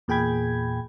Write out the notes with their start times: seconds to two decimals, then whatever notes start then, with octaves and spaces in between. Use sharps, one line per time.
0.08 E2 A#2 G#4 G5 B5 G#6